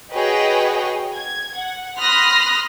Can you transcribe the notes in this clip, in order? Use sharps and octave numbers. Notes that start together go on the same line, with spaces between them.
F#4 G#4 B4 C#5 D#5 G5
G#6
F#5
B5 C6 D#6 F6 F#6 A#6